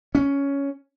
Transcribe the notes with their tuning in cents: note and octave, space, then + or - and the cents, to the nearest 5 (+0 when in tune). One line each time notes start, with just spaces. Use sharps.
C#4 +10